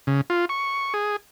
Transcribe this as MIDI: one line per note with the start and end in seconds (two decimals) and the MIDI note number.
0.07 0.21 49
0.30 0.45 65
0.49 0.94 85
0.94 1.16 68